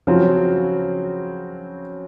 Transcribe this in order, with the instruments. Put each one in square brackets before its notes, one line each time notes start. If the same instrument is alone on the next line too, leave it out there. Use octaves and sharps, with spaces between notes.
[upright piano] C#3 F#3 C4 F#4 [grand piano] F3 F4